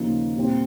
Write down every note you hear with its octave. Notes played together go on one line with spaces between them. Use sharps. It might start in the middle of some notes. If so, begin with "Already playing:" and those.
Already playing: D#2 C#3 F3 A#3 D#4
A#2 G3 C4 G4